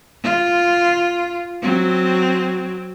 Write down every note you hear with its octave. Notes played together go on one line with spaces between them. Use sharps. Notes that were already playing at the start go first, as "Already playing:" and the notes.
F4
F#3 C4